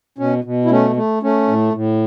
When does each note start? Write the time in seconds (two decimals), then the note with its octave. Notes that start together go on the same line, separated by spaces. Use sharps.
0.18 B2 C#4
0.44 B2
0.65 E4
0.70 A3 C#4
0.96 A3
1.23 A3 C#4
1.48 A2
1.73 A2